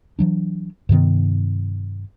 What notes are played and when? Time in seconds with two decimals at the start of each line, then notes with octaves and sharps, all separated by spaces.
0.19 E3 F#3 D4
0.89 G2 C3 D#3 B3